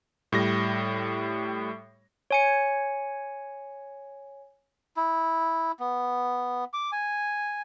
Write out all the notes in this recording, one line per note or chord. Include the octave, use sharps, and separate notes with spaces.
A2 G3 A#6
C#5 G#5 C#7
E4
B3
D6
G#5